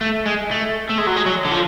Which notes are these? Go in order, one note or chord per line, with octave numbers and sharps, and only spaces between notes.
A3
G#3
A3
A3
G#3
F#3
G#3
F#3
D3
F3